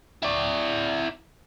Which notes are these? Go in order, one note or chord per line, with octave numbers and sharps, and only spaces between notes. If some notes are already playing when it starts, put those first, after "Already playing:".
E4 D5